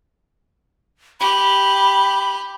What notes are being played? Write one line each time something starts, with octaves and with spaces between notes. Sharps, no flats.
G4 B5